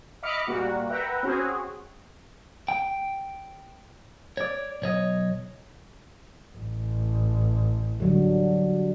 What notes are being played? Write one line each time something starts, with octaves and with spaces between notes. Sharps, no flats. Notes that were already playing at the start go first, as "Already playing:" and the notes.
D#5 E5 B5 D6 F6 C#7
A#2 G3 A#3 F#4
B4 E5 F#5 G5 A#5
C4 C#4 F#4 G#4
G5
C#5 D5
B1 C#5 D#5
A1
D3 F#3 G3